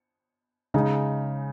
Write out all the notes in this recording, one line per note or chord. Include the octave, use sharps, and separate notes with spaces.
C#3 G#3 D#4